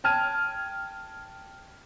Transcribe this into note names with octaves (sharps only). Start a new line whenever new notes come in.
G5 A5 F6 G#6 D#7